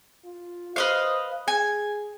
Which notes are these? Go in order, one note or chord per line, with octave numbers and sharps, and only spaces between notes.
F4
B4 C5 D#5 F5
G#4 G#5